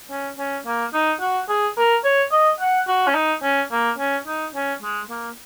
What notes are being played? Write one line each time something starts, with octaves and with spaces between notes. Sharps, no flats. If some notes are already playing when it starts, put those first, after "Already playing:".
C#4
C#4
A#3
D#4
F#4
G#4
A#4
C#5
D#5
F#5
F#4
C#4
D#4
C#4
A#3
C#4
D#4
C#4
G#3
A#3